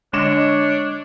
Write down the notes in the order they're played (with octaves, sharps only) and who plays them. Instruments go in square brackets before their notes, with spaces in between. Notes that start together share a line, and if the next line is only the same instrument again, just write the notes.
[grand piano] D3 D6 E7 [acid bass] G#3 [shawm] D4 [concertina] C#5